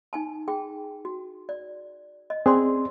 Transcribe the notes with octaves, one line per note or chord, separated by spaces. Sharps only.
D#4 G#5 A5
G#4 G5
F#4
D5
D#5
C4 C#4 G#4 D5 C6